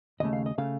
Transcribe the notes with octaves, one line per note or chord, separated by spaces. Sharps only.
D#2 C#3 A3 D#5
F5
D#5
C#3 A3 F5